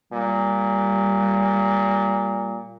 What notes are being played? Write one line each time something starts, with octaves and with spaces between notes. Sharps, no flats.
A#2 G3